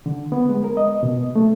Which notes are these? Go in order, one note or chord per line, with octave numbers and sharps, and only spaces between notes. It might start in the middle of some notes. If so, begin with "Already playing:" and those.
D3
B3
G#3
A#4
D#5
B2
A3